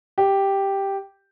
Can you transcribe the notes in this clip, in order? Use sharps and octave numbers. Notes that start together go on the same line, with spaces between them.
G4